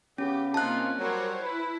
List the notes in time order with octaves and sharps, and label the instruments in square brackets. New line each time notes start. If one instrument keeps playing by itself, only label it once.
[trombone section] C#3 B3 [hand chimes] C#4 [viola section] G4
[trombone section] C3 D#4 F4 [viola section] A#3 C4 C#4 [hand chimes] A5 F#6
[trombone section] F#3 G3 [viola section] A#4 C5 C#5
[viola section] E4 [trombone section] B4